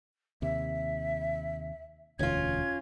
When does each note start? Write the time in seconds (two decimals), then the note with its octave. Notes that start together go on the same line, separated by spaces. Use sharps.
0.42 D#2 C3 E5
2.19 E1 D2 C#4 F4 G#6